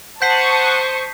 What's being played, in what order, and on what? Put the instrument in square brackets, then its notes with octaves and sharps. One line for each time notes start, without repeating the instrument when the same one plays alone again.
[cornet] C5 [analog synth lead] F#5 [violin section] A5 C#6 D#6 [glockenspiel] G6 B6 C7